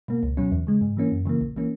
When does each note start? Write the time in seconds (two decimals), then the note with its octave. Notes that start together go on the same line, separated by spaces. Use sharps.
0.08 B2 A#3
0.23 C#2
0.37 B2 F#3 C#4
0.52 E2
0.67 C#3 G#3
0.81 G#2
0.97 E3 A#3 C#4
1.12 F#2
1.25 C#3 E3 A#3
1.41 A#1
1.56 E3 A#3 C#4